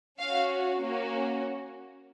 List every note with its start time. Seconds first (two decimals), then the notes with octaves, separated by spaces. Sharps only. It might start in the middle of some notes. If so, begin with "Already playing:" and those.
0.20 C#4 F#4 F5
0.80 A#3 C#4 F#4